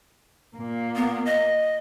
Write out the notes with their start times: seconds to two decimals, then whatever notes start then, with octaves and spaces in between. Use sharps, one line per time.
0.56 A#2 A#3
0.96 B3
1.26 D#5